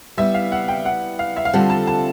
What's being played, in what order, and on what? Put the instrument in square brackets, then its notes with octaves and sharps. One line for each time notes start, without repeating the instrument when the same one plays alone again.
[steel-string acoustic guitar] G3 B3 E4 [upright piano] E5
[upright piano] F5
F#5
G5
F#5
F5
E5
F5
[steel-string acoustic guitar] D3 G3 C4 F4 A4 [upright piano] F#5
[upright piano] A5
A5